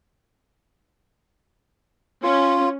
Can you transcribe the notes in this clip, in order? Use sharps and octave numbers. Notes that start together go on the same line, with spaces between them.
C#4 F4